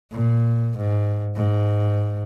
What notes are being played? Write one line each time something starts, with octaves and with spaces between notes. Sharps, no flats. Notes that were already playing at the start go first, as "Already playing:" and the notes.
A#2
G#2
G#2